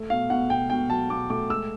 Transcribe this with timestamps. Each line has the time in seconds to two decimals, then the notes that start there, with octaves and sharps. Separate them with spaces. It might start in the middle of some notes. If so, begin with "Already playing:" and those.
Already playing: A3
0.10 B2 F5
0.30 B2 F#5
0.50 B2 G5
0.70 B2 G5
0.90 F#3 A5
1.10 B2 D6
1.30 A3 D6
1.50 G#3 E6